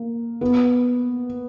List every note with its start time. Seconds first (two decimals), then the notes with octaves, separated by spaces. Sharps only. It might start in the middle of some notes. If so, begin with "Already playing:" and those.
Already playing: A#3
0.41 B3